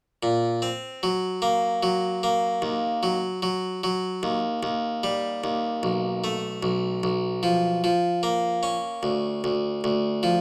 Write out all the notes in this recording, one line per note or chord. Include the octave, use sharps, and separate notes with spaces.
A#2
C4
F#3
A#3
F#3
A#3
D#2
F#3
F#3
F#3
D#2
D#2
G3
D#2
B1
A3
B1
B1
F3
F3
A#3
C#4
D2
D2
D2
F3